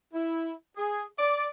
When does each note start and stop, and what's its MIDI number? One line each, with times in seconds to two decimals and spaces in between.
0.14 0.53 64
0.77 1.05 68
1.19 1.48 74